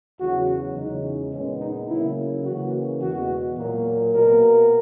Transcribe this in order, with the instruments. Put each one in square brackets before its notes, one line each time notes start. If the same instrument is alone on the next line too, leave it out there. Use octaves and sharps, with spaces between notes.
[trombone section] E2 C#3 F#3 F#4
E2 C#3 G#3 D#4
A#2 G#3 B3 C#4
D#4
C#3 F#3 A#3 E4
C#3 E3 A#3 F#4
E2 B2 G#3 F#4
A#2 F#3 A#3
B2 A#3 A#4